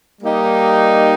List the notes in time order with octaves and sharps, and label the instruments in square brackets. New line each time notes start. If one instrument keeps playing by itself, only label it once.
[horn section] G3 A#3 D#4 G4